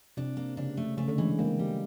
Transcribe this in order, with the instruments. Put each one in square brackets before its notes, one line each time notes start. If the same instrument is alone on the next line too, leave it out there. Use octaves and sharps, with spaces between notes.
[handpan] C3 [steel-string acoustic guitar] D4
[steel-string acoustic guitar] A#3
[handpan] C#3 [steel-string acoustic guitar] D4
[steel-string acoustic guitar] A3
[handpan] C#3 [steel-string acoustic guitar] A3
[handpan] D3
[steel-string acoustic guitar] E3 [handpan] G#3
[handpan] G#3 A#3 [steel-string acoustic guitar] C4
[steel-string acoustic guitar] G3